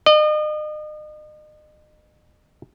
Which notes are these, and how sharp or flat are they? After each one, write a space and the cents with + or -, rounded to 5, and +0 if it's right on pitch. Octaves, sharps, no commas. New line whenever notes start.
D#5 -40